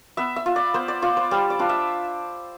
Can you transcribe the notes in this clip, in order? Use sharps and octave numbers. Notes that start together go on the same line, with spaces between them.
B3 E5
E5
F4
D5
B3 C5
D5
F4 D5
C5
G3 C5
D5
D4 F4
E5